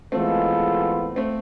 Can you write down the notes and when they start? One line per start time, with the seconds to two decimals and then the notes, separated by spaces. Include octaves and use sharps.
0.12 E3 G#3 A3 B3 C4 F4 A4
1.16 A3 C4